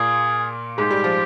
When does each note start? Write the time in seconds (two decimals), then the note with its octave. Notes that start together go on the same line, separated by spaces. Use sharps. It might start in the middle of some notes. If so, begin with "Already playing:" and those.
Already playing: A#2 A#3 G#4
0.78 G#2 G#3 G4
0.91 G3
1.04 F3